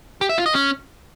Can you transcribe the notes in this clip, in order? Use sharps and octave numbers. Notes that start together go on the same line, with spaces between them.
G4
E5
F4
D#5
C#4